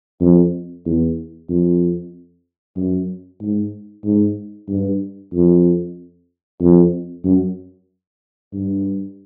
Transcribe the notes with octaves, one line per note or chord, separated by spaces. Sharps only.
F2
E2
F2
F#2
G#2
G#2
G2
F2
F2
F#2
G2